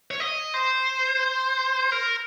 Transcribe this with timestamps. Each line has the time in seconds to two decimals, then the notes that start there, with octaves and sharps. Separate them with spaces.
0.11 C#5
0.20 D#5
0.54 C5
1.92 A#4